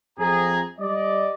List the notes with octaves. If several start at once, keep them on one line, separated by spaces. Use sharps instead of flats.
F2 G#4 A#5
G3 D5 D#5